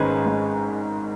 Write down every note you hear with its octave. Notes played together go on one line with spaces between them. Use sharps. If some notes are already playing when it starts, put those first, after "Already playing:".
Already playing: G#1 G#2 D#3 G#3 C#4 G#4 B4
G#1